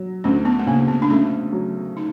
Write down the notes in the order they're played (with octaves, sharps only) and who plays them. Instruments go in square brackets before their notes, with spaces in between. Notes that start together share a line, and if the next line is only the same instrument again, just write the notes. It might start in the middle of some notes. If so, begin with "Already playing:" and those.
Already playing: [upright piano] F#3
[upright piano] D2 [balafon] C#4
[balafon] B3
A3
[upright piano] C#3 [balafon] A#3
[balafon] B3
D4
[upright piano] A3 [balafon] C#4
[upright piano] F#3
[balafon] D#4